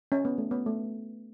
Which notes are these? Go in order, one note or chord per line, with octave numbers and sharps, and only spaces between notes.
C#4
B3
A3
B3
A3